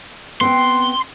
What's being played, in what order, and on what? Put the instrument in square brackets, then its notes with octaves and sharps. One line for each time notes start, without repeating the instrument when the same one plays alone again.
[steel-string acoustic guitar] B3 C4 G5 [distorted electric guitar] C6